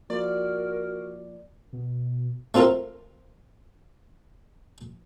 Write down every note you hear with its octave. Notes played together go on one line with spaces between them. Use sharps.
F3 A#3 F4 F#4 A#4 D5
B2
A3 C4 F4 A4 A#4